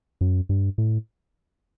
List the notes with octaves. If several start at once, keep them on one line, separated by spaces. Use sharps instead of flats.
F#2
G2
A2